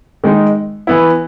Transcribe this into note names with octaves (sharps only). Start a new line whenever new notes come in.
D#3 G#3 D#4
E3 B3 E4